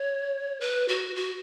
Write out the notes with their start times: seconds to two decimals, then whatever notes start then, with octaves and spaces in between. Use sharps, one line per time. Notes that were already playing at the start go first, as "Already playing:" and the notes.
Already playing: C#5
0.61 B4
0.88 F#4
1.16 F#4